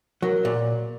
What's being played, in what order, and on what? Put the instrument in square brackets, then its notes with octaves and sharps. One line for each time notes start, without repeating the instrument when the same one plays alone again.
[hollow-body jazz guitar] F#3 [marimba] A#4
[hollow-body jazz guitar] A#2